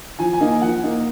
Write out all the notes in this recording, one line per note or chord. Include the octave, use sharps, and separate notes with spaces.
F3 G#5
G#5
A#3 D#4
G#5
F3 F#5
A#3 D#4